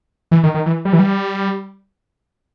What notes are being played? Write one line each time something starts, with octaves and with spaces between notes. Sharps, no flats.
E3
D#3
D#3
E3
G3
E3
G3